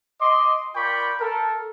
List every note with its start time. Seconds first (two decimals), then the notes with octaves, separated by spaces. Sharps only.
0.20 D#5 C6 D6
0.76 F4 A#4 D5 G5 B5 C#6
1.20 A4 A#4